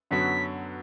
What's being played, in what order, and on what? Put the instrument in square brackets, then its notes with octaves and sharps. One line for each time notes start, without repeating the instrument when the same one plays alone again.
[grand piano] F#2 D3 F#3 B3 F#4 [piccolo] B6